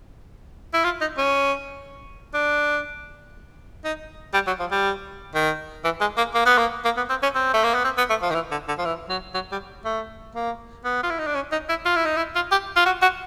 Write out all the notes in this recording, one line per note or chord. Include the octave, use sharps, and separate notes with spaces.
E4
F4
D#4
C#4
D4
D#4
G3
F#3
F3
G3
D#3
E3
G#3
A#3
A#3
B3
A#3
A#3
B3
C4
C#4
C4
A3
A#3
B3
C4
B3
A3
F3
D#3
E3
D3
D3
F3
E3
F#3
F#3
G3
A3
A#3
B3
F4
E4
D#4
D4
C#4
D#4
E4
F4
E4
D#4
E4
F4
G4
F4
F#4
F#4